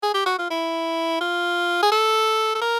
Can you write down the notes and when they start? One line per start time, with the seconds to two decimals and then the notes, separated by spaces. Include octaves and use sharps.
0.03 G#4
0.14 G4
0.26 F#4
0.39 F4
0.50 E4
1.21 F4
1.83 G#4
1.92 A4
2.55 A4
2.61 A#4